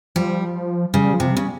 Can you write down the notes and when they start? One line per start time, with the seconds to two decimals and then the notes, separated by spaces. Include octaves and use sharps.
0.15 F3 G3
0.94 C#3 G3
1.14 F3
1.20 C3
1.32 C#3 G3